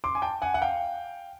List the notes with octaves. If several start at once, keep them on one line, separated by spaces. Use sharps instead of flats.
C6 D6
G#5
G5 A5
F#5 G#5
F#5
F5 G5